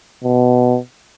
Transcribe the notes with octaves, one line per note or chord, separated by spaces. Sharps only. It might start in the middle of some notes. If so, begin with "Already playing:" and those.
B2